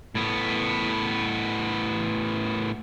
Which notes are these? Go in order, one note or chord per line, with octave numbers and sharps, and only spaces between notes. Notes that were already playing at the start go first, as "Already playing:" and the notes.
A2 B3